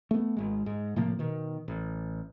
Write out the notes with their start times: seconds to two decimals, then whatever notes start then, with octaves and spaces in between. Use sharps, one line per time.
0.11 A3 B3
0.37 G#1 G#3
0.66 G#2
0.96 A2 C3 F3 A#3
1.19 B2 D#3
1.68 A1